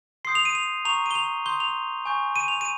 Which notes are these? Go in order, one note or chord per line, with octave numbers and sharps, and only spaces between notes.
C6 D#6 G6 C7
F7
D#7
F7
A#5 C#6 G6 F7
D#7
G7
F7
C6 D#6 G6 G7
F7
G#5 C#6 G6
D#7
F7
D#7